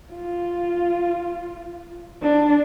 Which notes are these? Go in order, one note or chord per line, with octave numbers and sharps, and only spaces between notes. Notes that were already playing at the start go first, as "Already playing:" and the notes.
F4
D4